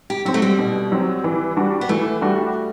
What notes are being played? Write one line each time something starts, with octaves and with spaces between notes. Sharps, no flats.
G4
F#3 C4 F#4
A3
G3
B2
F#3 C4
E3
G3 D4 F#4
B3
E3 A3
G3 D4 F#4